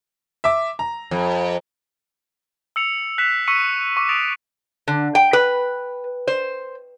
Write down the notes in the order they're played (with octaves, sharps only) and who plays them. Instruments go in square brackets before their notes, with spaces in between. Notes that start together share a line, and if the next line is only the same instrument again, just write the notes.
[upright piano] E5 D6
A#5
[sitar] F2
[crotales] E6 C#7 F7
F#6 B6 C7 E7 F7
C#6 E6 B6 C#7 D#7
C#6 D6
D#6 A6 B6 D7 E7 F7
[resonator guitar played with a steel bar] D3
G5
B4
C5